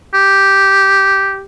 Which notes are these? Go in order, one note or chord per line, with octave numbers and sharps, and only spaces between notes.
G4